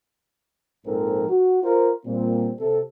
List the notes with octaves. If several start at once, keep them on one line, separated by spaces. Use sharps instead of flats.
A#1 G#2 F3 C4 A4 A#4
F#4
F4 A#4 C5
A#2 G3 C4
C3 A4